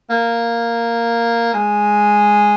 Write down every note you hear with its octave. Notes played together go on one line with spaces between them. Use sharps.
A#3
G#3